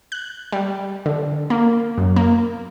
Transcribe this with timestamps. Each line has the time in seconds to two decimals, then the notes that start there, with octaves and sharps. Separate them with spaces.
0.12 F#6
0.52 G3
1.06 D3
1.50 A#3
1.98 F#2
2.16 A#3